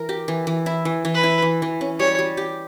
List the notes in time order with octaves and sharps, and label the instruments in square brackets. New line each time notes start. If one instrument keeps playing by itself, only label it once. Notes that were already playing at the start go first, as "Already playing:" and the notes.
Already playing: [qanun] E3 A#4
G4
E3
E3
E4
E3
E3
[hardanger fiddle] B4
[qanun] E4
E3
E3
C#4
[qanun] G3 [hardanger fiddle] C#5
[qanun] G3
G4